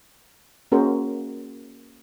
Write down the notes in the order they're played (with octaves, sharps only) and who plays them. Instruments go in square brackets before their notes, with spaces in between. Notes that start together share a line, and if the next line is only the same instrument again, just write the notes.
[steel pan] A#3 C#4 F#4 G#4 A#4 C5